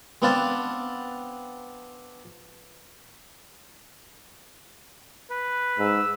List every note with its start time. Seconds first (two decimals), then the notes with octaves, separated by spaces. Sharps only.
0.22 B3 C4 D4 B4 F5 A5
5.31 B4
5.78 G#2 E6